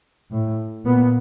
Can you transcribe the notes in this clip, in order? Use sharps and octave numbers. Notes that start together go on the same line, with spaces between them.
A2
A#2 B3